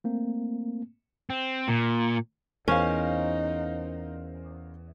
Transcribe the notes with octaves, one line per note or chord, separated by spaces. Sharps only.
A3 A#3 C4
C4
A#2
E2 C#4 D#4 A#4 C5 F5